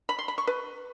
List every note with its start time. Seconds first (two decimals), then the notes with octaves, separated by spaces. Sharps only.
0.09 B5
0.19 C6
0.28 B5
0.38 C#6
0.47 B4